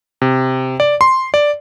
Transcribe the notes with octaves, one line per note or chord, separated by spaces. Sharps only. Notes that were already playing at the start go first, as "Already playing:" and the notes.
C3
D5
C6
D5